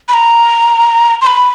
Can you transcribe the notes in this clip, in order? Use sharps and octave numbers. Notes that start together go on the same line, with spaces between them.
B5
A#5
C6
B5